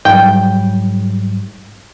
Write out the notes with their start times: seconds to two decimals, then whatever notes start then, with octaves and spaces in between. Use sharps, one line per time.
0.05 G#2 F#3 G3 G5